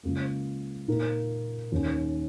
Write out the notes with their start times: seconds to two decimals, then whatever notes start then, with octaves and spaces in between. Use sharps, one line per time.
0.03 C#2 C#3 A#3
0.88 A#2 A#3 D#4 A#4
1.72 D#2 D#3 C#4